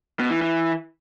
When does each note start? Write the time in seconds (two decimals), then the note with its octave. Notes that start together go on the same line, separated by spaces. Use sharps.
0.20 B2
0.31 E3
0.42 E3